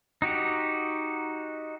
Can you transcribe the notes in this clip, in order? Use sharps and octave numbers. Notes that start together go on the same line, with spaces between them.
D#4 F#4 G4